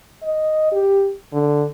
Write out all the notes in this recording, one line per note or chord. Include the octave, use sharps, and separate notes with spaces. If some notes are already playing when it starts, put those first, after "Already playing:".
D#5
G4
D3